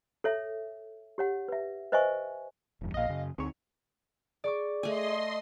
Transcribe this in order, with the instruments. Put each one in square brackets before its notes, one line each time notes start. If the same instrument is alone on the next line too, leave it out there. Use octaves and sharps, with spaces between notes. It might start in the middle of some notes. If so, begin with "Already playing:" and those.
[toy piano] A4 C#5 E5
G4 C#5 F#5
B4 E5
B4 C5 D#5 E5 G#5 C#6
[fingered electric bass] E1 E2 G2
[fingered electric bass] A#1 A#2 [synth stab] D#5 F5
[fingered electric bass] F#2 C#3
[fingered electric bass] D2 C4 [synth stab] G#2 C#5
[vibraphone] G#4 [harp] D5 C#6 D6
[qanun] A3 G#5 [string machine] D#5 C6